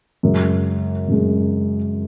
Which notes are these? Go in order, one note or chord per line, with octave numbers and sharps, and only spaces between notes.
F#2 C#3 G#3
F#2 C#3 G#3